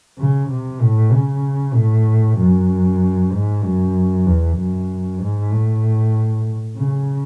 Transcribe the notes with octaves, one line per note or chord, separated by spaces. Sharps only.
C#3
C3
A2
C#3
A2
F#2
G#2
F#2
E2
F#2
G#2
A2
C#3